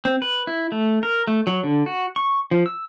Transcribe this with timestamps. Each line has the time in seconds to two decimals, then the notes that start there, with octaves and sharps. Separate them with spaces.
0.05 C4
0.22 B4
0.47 E4
0.72 A3
1.03 A#4
1.27 A3
1.47 F#3
1.63 D3
1.86 F#4
2.16 C#6
2.51 F3
2.66 E6